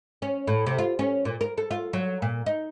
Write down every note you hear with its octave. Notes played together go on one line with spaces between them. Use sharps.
C#4
A2
C3
F4
C#4
A#2
A#4
A4
F4
F#3
A#2
D#4